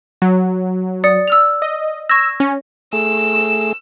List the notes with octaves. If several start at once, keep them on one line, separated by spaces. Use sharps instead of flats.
F#3
D5 D#6 C#7
E6 F6 F7
D#5
C#6 E6 G#6 A#6
C#4
A3 G#4 E6